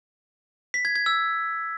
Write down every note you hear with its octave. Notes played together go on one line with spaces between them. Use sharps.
B6
G#6
G#6
E6